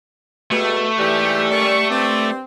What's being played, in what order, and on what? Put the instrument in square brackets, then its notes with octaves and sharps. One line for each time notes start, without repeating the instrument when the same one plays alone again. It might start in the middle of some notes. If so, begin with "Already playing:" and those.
[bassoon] B2 [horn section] G3 G#4 [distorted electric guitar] A3
[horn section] G#2 E3 [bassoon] G3 [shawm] G4
[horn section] D#3 C#4 D5 [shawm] C#6
[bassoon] G2 [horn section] C4 [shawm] D5